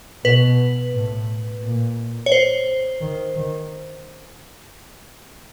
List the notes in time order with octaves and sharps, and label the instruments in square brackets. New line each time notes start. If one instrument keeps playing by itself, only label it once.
[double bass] B2 [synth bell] B4
[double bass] A2
A#2
[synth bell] C#5
C5
[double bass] D#3
D#3